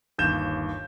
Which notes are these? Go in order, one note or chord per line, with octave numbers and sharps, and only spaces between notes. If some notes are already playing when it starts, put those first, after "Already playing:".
G1 D#2 G6 E7